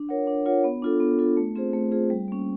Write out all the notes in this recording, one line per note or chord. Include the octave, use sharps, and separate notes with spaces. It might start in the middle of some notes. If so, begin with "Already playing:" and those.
Already playing: D4
F4 A#4 C#5 F#5
D4
F4 A#4 C#5 F#5
B3
D4 F4 A4
B3
D4 F4 A4
A3
C4 F4 G#4 C5
A3
C4 F4 G#4 C5
G3
A#3 C#4